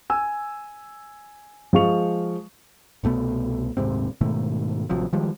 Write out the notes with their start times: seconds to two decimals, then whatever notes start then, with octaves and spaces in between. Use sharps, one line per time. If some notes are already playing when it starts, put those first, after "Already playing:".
0.10 G#5 E6
1.73 F3 G#3 F5 C#6 F7
3.04 C2 B2 A3 B3
3.77 D#1 G#2 C3 C4
4.21 G#2 B2 D#3 A3
4.90 A1 C3 F3 F#3
5.13 D#3 F3 G3 G#3